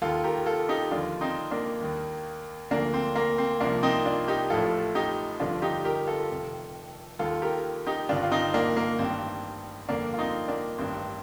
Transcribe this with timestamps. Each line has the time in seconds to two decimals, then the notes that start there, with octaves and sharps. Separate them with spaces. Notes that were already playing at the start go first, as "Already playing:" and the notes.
0.02 D#2 D#3 F4 A4
0.24 G4 A#4
0.46 F4 A4
0.69 D#4 G4
0.91 D#2 D3 F3 D4 F4
1.21 C4 D#4
1.51 A#3 D4
1.81 D#2 D#3
2.71 D2 D3 F3 A#3 D4
2.94 C4
3.16 A#3
3.38 C4
3.60 C2 C3 F3 A#3 D4
3.83 C4 D#4
4.05 D4 F4
4.28 D#4 G4
4.50 A1 A2 F3 F4 A4
4.95 D#4 G4
5.40 G1 F2 D3 F3 D4 F4
5.62 D#4 G4
5.85 G4 A#4
6.07 F4 A4
6.29 F1 F2 D#3
7.19 D#2 D#3 F4 A4
7.42 G4 A#4
7.86 D#4 G4
8.09 G1 G2 D#3 D4 F4
8.23 F4
8.32 C4 D#4
8.54 A#3 D4
8.77 A#3
8.99 A1 G2 D#3 C4
9.89 G1 F2 D3 A#3 D4
10.14 F4
10.18 C4 D#4
10.48 A#3 D4
10.78 A1 G2 D#3 C4